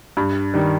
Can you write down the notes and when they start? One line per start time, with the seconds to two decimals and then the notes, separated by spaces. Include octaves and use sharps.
0.17 G2
0.54 D#3 G3